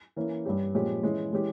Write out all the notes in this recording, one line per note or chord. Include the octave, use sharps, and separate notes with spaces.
E3 A#3 C#4
G2 G3 C#4 G4
A#2 F3 G#3 C#4 G4
E3 G#3 C#4
E3 G#3 C#4 G4